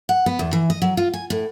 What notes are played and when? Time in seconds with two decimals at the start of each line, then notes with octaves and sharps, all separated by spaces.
0.09 F#5
0.26 B3
0.39 E2
0.53 E3
0.70 D#5
0.82 F#3
0.97 F4
1.14 G#5
1.30 A2